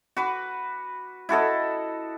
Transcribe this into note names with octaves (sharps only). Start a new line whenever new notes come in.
F#4 B4 D6
E4 F#4 A4 D#5